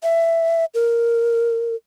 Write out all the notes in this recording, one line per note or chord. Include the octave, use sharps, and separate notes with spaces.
E5
A#4